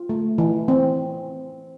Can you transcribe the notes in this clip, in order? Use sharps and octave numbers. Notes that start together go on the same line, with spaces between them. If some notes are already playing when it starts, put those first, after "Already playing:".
Already playing: F4
A3
E3
C4